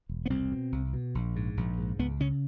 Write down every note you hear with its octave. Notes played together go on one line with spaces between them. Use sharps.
E1
B3
C2 C4
B2
C2
B2
A#1
G#2
A#1
G#2
C#2 B3
C#3 C#4